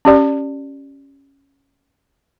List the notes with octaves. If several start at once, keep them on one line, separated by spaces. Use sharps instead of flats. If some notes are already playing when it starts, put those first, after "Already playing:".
C#4 G4 D5